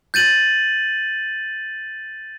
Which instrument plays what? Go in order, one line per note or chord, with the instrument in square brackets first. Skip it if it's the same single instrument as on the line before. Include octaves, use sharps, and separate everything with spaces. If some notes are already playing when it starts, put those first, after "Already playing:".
[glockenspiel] G6 A6 D#7 F#7